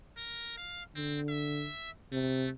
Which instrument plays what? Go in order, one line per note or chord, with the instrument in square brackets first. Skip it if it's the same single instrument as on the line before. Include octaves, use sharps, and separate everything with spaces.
[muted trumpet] A#4
F5
[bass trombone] D3 [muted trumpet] C4
[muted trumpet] E5
[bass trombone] C3 [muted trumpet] A3